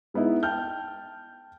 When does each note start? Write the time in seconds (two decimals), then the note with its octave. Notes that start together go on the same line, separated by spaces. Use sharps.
0.14 G#3 B3 D#4 E4
0.43 G5 A5 F6 G6